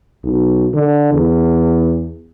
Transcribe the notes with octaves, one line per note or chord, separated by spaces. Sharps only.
B1
D3
E2